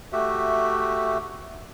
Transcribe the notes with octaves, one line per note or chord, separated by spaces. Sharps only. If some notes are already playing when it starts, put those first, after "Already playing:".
A3 F#4 G4 E5